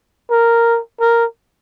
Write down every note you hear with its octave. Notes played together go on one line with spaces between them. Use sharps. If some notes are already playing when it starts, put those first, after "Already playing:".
A#4
A#4